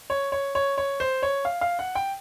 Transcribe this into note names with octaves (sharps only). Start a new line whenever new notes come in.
C#5
C#5
C#5
C#5
C5
C#5
F5
F5
F#5
G5